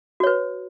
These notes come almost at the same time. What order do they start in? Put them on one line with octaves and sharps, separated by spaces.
F#4 C#5 B4